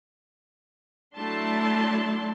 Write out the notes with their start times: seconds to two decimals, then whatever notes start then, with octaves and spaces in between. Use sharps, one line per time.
1.16 F#3 A3 D4 E4 A5 C6